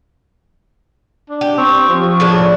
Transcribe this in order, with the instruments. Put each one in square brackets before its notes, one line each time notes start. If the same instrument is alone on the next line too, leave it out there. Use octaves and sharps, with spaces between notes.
[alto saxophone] D4
[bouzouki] G4
[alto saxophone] C4 [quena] C#6
[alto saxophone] F3
[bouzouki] A2 C#3 D4